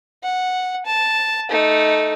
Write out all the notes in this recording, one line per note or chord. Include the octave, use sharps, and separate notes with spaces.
F#5
A5
A3 D#4